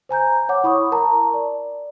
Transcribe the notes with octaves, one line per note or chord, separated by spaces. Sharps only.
C5 G#5 A#5 G6
C#5 F#5 D6
E4 B5 C#6 D#6
A#4 A5 A#5
D5